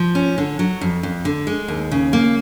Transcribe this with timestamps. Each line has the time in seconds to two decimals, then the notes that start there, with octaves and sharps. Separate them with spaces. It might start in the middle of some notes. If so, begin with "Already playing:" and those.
Already playing: F3
0.15 C#4
0.38 D3
0.59 F#3
0.81 F2
1.03 F2
1.25 D3
1.47 G#3
1.68 D#2
1.91 C#3
2.13 A#3